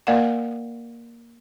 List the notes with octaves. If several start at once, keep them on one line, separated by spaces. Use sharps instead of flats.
A#3 A#4 D5 F5 F#5